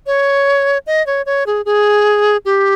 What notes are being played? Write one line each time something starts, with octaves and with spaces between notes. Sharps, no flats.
C#5
D#5
C#5
C#5
G#4
G#4
G4